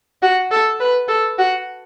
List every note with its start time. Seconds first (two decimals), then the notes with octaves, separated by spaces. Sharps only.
0.23 F#4
0.51 A4
0.80 B4
1.08 A4
1.38 F#4